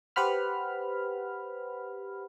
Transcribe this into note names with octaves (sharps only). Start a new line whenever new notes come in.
G4 B4 C5 F#5 B5 F6